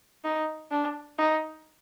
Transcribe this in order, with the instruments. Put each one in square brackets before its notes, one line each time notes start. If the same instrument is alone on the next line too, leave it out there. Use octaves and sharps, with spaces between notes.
[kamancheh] D#4
D4
D#4